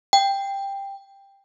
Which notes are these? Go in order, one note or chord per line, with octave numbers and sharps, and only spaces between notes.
G5